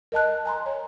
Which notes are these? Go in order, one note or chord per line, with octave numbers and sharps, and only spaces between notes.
A#4 D#5 A5 F#6
G#5 A#5 C6
C#5